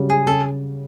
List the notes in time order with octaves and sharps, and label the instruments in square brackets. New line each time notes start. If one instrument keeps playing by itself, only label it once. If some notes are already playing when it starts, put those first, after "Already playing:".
Already playing: [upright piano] C#3 F#3 G3
[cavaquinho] G#4
[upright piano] C#3 [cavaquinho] A4